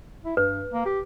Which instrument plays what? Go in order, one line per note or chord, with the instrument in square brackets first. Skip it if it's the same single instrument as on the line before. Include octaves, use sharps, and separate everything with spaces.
[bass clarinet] E4
[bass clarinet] G2 [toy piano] B4
[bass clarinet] A#3
G4